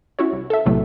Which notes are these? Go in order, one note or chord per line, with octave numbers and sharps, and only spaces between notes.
C#4 E4 F#4 C#5
C2
A4 E5
B1 E2 A2 C3 F#3 A3